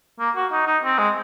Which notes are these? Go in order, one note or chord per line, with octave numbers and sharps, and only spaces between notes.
A#3
F#4
D#4
D#4
C4
G#3